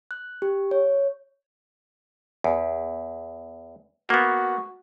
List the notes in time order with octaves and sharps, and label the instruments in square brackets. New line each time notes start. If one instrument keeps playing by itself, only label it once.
[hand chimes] F#6
G4
C#5
[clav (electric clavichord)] E2
[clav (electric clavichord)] A#3 B3 [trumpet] F#4